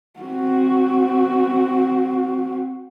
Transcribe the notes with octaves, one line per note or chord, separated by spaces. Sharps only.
C4 F#4